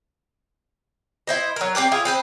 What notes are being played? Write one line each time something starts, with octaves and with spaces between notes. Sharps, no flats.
E4 C5 D#5
F#3 A#4
C4 C#4 G4 C5
E4 F4 G#4
C4 B4 C5